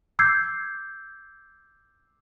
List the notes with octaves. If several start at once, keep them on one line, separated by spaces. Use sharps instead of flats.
D6 E6 G6 G#6 C7